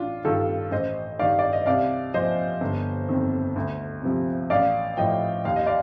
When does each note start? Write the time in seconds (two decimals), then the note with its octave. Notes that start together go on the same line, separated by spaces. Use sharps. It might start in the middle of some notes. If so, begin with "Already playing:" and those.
Already playing: A1 D4 F4
0.25 G2 D#3 F4 A4
0.71 A1 C5 D#5
1.19 G2 D#3 D5 F5
1.39 D5
1.53 D#5
1.66 C2 D5 F5
2.14 A#2 F3 C5 D#5
2.61 G1
3.09 F2 D#3
3.56 D2
4.03 C3 F3
4.50 A1 D5 F5
4.97 A2 F3 D#5 G5
5.45 D#2 F5
5.56 D#5
5.67 D5 F5